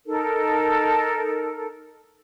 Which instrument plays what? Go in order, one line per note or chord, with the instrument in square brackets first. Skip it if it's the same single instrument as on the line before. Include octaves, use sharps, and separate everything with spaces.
[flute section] D#4 A4 A#4